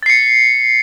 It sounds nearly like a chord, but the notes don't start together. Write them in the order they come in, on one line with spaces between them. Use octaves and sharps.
A6 C7 C#7